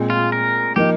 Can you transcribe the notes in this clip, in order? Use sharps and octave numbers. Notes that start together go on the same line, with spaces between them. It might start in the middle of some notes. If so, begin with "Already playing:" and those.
Already playing: A#2 G#3 C4
F4
A#4
F3 A#3 D#4 G4